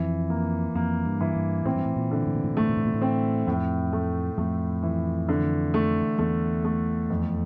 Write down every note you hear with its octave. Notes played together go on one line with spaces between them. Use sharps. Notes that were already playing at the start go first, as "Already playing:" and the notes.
Already playing: F2 E3
A#3
F2 A#3
G2
E3
G2
A2 C4
G2
A2
A#2
D3
A2
A#2
A2
A#2
A2 A3
A#2
A2
A#2
A2
C4
F2 A2
A3
F2 A3
E3
D3
A3
E2 A3
A3
F2